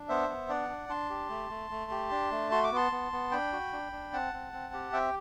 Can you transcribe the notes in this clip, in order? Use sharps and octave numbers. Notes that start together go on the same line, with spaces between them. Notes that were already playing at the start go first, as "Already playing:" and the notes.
Already playing: D4
B3 C5 E5
B3
D4 D5 F#5
D4
D4 A5 C6
G4
A3
A3
A3
G4
D4
A3
F#4 C6
D6
B3 A5 C6
B3
B3
D4 G5 B5
F#4
D4
D4
C4 F#5 A5
C4
C4
G4
C4 E5 G5